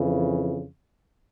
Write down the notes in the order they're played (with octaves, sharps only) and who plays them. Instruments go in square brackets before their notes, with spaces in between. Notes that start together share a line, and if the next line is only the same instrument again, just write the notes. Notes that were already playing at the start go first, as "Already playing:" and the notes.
Already playing: [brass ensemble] F2 C#3 E3